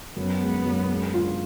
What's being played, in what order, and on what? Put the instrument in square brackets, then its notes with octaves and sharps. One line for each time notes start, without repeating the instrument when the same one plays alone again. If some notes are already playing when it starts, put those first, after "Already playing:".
[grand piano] F#2 [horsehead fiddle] B3
[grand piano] G#3
F#2
G#3
F4